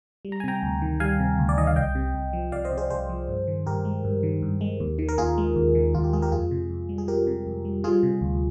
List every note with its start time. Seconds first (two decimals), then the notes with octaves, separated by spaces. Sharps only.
0.25 G3
0.32 A#5
0.40 G#5
0.44 C3 G5 A#5
0.63 D2
0.82 D#3
1.00 G3 F5 G#5
1.19 C3
1.39 D2
1.49 D5
1.58 D#3 D#5
1.67 F5
1.76 C2 D#5 G5
1.95 C3
2.15 C2
2.33 F3
2.52 C2 D5 F5
2.65 C5 D#5
2.71 C3
2.78 G#4 C5
2.90 C2 G#4 C5
3.09 F3
3.29 G2
3.47 D#3
3.66 G2 G4 A#4
3.85 G#3
4.04 G2
4.23 D#3
4.42 G2
4.61 G#3
4.80 D#2
4.99 D#3
5.09 A#4
5.18 D#2 F4 G#4
5.38 G#3
5.56 D#2
5.75 D#3
5.95 D#2 F4
6.04 G4
6.13 G#3 F4 G#4
6.22 G4 A#4
6.32 F2 F4 G#4
6.51 C3
6.70 F2
6.89 G3
6.98 G#4
7.07 F2 G4 A#4
7.27 C3
7.47 F2
7.65 G3
7.84 G3 F4 G#4
8.03 C3
8.21 D2